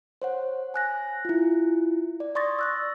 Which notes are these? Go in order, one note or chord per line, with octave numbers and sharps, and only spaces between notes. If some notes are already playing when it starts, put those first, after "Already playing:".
C5 C#5 F#5
G#5 F#6 A#6
E4 F4
D5
D5 C6 C#6 D#6 A6 A#6
E6 F#6 A#6